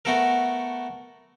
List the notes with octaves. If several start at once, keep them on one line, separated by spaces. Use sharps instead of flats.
A3 B3 F#4 A4 A#4